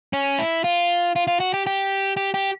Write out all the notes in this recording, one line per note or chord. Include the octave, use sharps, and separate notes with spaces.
C#4
E4
F4
F4
F4
F#4
G4
G4
G4
G4